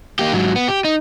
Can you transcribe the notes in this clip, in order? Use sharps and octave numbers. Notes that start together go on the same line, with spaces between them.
A#3 G4
G#2 F#3
B3
G4
D#4